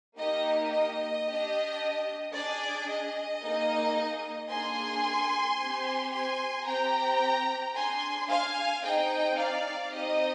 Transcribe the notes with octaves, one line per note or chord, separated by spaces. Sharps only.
A#3 D#4 G4 D#5
D#5
D4 G4
D4 G#4 D5
D#5
A#3 D#4 G#4
A#3 D4 G#4 G#5 C6
C4 G4
G#5 C6
C4 G4 G5 A#5
D4 G#4 G#5 C6
F5 G#5
C4 D#4 G#4 D#5 G5
D5 F5
C4 D#4 G4 D#5